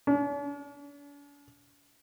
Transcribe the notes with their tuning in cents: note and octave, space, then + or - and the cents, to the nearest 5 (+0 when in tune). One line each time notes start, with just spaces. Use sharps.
D4 -45